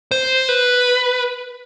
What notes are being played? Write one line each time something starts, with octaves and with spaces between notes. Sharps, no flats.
C5
B4